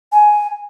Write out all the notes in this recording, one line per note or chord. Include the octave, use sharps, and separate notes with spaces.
G#5